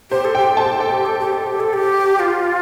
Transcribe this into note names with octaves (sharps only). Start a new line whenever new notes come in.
G4 C5
A4
G4 G5
A4
A5
G4
A4 G5
G4
A4
G4
A4
G4
A4
G4
F4